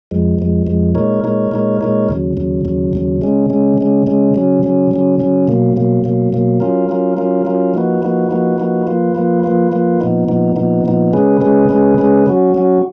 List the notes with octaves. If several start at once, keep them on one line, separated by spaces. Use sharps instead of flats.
F2 F3 G#3
F2 F3 G#3
F2 F3 G#3
A#2 G#3 D#4 A#4 C#5
A#2 G#3 D#4 A#4 C#5
A#2 G#3 D#4 A#4 C#5
A#2 G#3 D#4 A#4 C#5
D#2 C#3 F#3
D#2 C#3 F#3
D#2 C#3 F#3
D#2 C#3 F#3
C#3 G#3 C#4
C#3 G#3 C#4
C#3 G#3 C#4
C#3 G#3 C#4
C#3 F#3 C#4
C#3 F#3 C#4
C#3 F#3 C#4
C#3 F#3 C#4
B2 F#3 A#3
B2 F#3 A#3
B2 F#3 A#3
B2 F#3 A#3
F#3 C#4 F4 A#4
F#3 C#4 F4 A#4
F#3 C#4 F4 A#4
F#3 C#4 F4 A#4
F3 A#3 D#4 F#4 B4
F3 A#3 D#4 F#4 B4
F3 A#3 D#4 F#4 B4
F3 A#3 D#4 F#4 B4
F3 A#3 F4 B4
F3 A#3 F4 B4
F3 A#3 F4 B4
F3 A#3 F4 B4
A#2 F3 B3 D#4
A#2 F3 B3 D#4
A#2 F3 B3 D#4
A#2 F3 B3 D#4
C#3 G#3 C#4 G#4 B4
C#3 G#3 C#4 G#4 B4
C#3 G#3 C#4 G#4 B4
C#3 G#3 C#4 G#4 B4
F#3 C#4 F#4
F#3 C#4 F#4